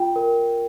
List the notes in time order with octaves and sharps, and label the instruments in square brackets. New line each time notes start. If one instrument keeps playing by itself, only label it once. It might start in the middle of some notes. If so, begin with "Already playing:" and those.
Already playing: [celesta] F4 G5
A#4